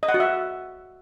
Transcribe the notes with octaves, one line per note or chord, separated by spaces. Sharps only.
D#5
F#5
F#4
E5